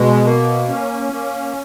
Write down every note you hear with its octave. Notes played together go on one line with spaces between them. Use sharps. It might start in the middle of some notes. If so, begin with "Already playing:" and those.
Already playing: B2 G#3
A#3
C#4
A#3